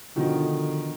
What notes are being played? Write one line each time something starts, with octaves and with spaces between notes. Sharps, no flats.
B2 D3 D#3 F3